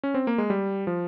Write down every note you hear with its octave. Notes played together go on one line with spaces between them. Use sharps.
C#4
C4
A#3
G#3
G3
F3